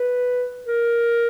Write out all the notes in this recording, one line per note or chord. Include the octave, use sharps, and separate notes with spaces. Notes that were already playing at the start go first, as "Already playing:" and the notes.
Already playing: B4
A#4